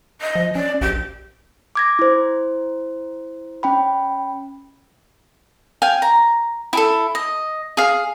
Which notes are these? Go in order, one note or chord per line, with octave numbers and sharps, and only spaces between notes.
D#5
F3
C#4 D5
A#1 G4
D6 G#6 A#6
E4 C5
C#4 G5 B5
F5 G5 G#5
A#5
E4 G#4 A4
D#5
G#4 F5